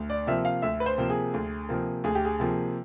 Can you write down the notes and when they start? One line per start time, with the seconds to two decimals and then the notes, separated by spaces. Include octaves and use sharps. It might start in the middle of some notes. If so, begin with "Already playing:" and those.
Already playing: D2
0.10 D5
0.27 C3 F3 A#3 E5
0.45 F5
0.62 D2 E5
0.80 B4
0.86 C5
0.98 C3 F3 A#3
1.10 G#4
1.34 D2
1.69 C3 F3 A#3
2.04 D2 G#4
2.15 G4
2.25 G#4
2.40 C3 F3 A#3